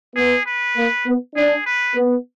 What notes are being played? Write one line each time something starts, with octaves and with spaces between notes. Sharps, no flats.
B3 G#4
B4
A#3
B3
D4 G#4
B4
B3